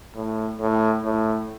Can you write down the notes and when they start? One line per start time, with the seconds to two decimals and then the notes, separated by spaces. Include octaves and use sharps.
0.15 A2
0.60 A2
1.05 A2